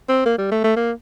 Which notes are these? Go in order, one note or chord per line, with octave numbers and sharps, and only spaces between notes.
C4
A#3
G3
A3
A3
A#3